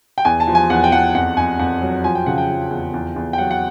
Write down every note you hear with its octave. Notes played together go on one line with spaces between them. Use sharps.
G5
E2 G#5
A5
F3
G#5
E2 F#5
G5
E2 F#5
F2 F#5
F2 G#5
F2 F#5
F#3
F3 G#5
G5
C#3 F#5
G5
F3
E2
E2
E2
G5
F#3 F#5
F#5